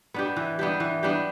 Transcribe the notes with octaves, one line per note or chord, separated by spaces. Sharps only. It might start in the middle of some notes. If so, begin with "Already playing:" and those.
B3 D4 G4
E3
B3 D4 G4
E3
B3 D4 G4